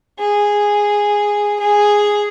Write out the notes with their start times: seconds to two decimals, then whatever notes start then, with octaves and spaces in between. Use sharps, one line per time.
0.19 G#4
1.60 G#4